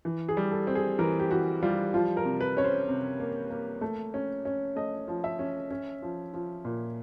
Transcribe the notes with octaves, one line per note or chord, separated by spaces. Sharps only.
E3
G#4
G3
A4
C4
G#4
E3 A#4
G4
E3 F#4
G3 F4
F3 F4
A#4
C3
B4
C#4 C#5
C5
C3
A#3
A#3
A3
C#4
C#4
A3 D#5
F3
E5
C#4
C#4
F3
F3
A#2